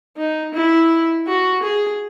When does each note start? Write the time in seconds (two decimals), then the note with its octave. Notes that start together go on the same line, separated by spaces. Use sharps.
0.17 D#4
0.54 E4
1.27 F#4
1.63 G#4